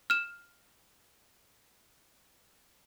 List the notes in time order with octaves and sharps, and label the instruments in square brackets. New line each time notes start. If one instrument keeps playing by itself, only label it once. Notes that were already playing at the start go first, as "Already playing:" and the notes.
[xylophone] F6 E7